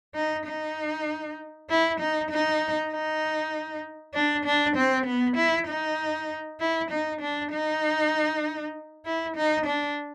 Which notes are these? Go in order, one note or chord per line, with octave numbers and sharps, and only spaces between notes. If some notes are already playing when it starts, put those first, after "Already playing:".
D#4
D#4
E4
D#4
D#4
D#4
D4
D4
C4
B3
E4
D#4
E4
D#4
D4
D#4
E4
D#4
D4